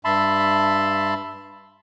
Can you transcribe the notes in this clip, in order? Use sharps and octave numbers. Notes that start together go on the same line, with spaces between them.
G2 E5 A5 B5 C6